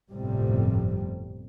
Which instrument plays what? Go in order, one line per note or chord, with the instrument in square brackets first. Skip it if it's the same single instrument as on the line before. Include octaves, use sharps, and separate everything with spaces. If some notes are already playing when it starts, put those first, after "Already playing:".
[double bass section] G1 F2 A2 C3 G3